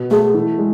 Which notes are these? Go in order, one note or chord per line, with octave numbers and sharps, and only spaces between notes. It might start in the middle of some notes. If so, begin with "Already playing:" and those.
Already playing: B2 B3
A3 G#4
E3
G#3